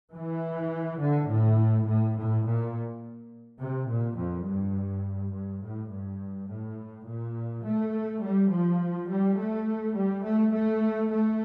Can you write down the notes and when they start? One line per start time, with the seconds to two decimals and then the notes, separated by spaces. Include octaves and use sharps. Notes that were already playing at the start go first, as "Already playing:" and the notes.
0.12 E3
0.99 D3
1.28 A2
1.86 A2
2.15 A2
2.44 A#2
3.59 C3
3.88 A#2
4.17 F2
4.46 G2
5.32 G2
5.62 A2
5.90 G2
6.48 A2
7.06 A#2
7.64 A3
8.21 G3
8.50 F3
9.08 G3
9.37 A3
9.95 G3
10.23 A3
10.53 A3
11.10 A3